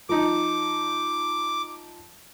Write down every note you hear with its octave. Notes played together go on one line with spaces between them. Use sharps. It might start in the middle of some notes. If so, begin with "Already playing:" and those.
F3 D#4 D6